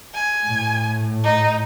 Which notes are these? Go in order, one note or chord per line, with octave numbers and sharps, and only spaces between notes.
G#5
A2
D#4